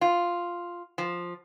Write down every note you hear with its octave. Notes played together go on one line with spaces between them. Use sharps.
F4
F3